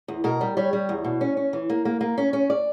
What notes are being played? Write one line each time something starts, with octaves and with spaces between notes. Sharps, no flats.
E2
B2 A#4
G3
G3 C#5
G3
E2
B2
C#4
C#4
E3
A#3
A#3
A#3
C#4
C#4
D5